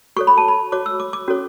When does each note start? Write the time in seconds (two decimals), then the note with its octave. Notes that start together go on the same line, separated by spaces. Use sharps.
0.16 F#4 A4 C#5 C#6
0.27 B5
0.38 A5
0.48 B5
0.72 F#4 C#5 D6
0.86 E6
1.00 D6
1.13 D6
1.28 C#4 F#4 A4 C#5